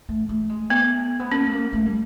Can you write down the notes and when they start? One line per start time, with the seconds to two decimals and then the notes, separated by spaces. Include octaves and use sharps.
0.09 A3
0.29 A3
0.49 G#3
0.70 A3 B3
1.20 B3
1.32 A#3 C#4
1.47 A3
1.52 A#3
1.73 A3
1.86 G3